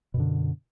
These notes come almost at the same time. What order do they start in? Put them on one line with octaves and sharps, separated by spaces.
B2 F#2 D3